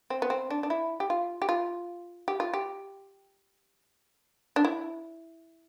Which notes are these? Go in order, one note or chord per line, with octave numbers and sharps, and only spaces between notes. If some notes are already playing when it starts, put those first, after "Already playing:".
C4
B3
C4
D4
D4
E4
G4
F4
G4
F4
G4
F4
G4
D4
E4